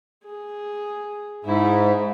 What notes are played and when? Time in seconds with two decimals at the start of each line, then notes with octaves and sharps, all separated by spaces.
0.24 G#4
1.45 G#2 E4